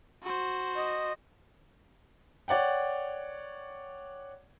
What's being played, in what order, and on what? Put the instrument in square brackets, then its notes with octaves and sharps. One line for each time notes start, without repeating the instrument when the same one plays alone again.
[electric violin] F#4 C5
[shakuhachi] D#5
[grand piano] C#5 D5 F#5 G5